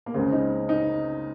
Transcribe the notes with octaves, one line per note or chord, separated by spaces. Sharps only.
A#3
C#2 C#3 C4
D#4
D#4